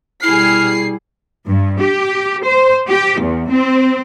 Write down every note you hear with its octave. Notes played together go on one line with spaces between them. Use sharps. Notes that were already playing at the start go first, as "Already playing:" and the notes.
B2 G3 E4 G#4 F6 C7
G2
G4
C5
G4
E2
C4